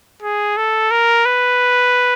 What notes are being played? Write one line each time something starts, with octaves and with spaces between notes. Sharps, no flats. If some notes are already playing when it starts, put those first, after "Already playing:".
G#4
A4
A#4
B4